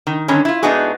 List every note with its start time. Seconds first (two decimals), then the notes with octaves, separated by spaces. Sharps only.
0.07 D#3
0.28 G2 D3 D#3 C#4
0.45 E4 F4
0.63 G#2 B3 D4 D#4 F#4 G#4